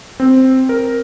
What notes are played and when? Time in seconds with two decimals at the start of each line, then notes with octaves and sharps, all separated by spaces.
0.20 C4
0.69 A#4